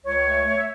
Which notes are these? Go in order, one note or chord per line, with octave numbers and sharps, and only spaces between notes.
C#2 C#5
A3
A3
E5